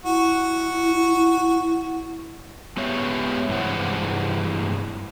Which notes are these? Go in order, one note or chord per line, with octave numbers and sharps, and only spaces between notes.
E4 F#4
G#3 B3 G4 C#5 E5
G2 C3 E3 G#3 C4 F#5